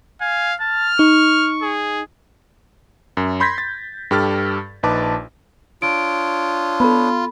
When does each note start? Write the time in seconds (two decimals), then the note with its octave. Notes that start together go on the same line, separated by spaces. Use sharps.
0.21 F5 G#5
0.60 A5 F6
0.99 D#4 C#6
1.62 G#4
3.17 F#2
3.40 B5 C6 G6 G#6 A#6 B6
3.58 A6
4.11 G2 G4 A4 F6 A6
4.83 A#1 D#4 B4 A5 D6
5.82 D4 F4 C#5 D#6 D7
6.80 B3 A4 B5